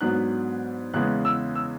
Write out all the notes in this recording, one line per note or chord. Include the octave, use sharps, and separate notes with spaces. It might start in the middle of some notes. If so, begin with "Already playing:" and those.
G#2 F#3 B3 D4 F#6
E2 C#3 G#3 B3 F#6
E6
E6